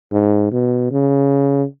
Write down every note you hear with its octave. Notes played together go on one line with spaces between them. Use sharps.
G#2
B2
C#3